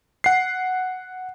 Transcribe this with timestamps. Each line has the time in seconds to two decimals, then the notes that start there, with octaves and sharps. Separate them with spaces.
0.24 F#5 C7